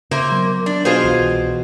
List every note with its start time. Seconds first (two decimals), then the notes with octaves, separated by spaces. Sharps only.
0.11 C#3 A#3 C5 E5 C6
0.31 F#3 B3
0.66 D4
0.85 B2 F4 G#4 C5
1.04 C2 E3